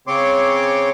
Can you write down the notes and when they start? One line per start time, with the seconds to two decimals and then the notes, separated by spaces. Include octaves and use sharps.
0.07 C#3 C4 C#5 C6 D6